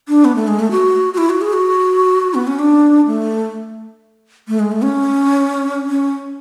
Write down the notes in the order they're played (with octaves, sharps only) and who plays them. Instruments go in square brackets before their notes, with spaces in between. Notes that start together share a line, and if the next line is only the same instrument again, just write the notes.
[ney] D4
B3
A3
G#3
A3
F#4
F#4
E4
F#4
G#4
F#4
B3
C#4
D4
A3
A3
G#3
A3
C#4
C#4